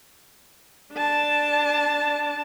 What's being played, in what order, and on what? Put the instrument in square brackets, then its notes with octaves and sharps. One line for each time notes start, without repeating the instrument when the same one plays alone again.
[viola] D4 A5